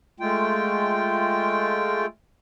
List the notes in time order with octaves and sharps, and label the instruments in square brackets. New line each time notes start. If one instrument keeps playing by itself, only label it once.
[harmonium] G#3 A3 F4 G5